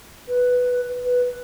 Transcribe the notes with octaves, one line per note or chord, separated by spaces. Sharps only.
B4
B4